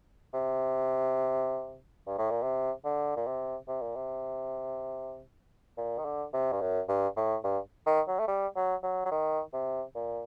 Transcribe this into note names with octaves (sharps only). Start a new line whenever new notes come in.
C3
G2
A2
A#2
C3
D3
A#2
C3
C3
A#2
C3
A#2
D#3
D3
C3
G2
F#2
G2
A2
G2
D#3
F#3
A3
G3
F#3
F#3
F#3
D#3
C3
A#2